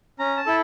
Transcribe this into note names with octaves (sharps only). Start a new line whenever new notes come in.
C#4 A#5
A5
E4 A4